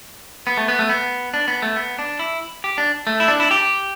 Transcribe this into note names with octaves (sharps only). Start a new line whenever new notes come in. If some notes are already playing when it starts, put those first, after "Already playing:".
B3
A3
B3
A3
B3
D4
B3
A3
B3
D4
E4
G4
D4
A3
E4
D4
E4
G4